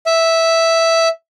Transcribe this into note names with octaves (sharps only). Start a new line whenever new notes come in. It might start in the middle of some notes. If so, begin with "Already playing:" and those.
E5